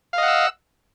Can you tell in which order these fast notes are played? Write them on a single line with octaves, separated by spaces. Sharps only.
F5 D#5 F#5 E6